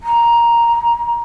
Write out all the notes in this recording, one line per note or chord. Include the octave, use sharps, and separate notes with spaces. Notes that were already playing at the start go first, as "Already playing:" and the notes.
A#5